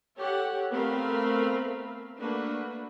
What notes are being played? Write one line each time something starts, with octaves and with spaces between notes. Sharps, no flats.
G4 A4 C#5 F#5
A3 B3 C4 A#4 F5 B5
A3 A#3 D4 F#4 B4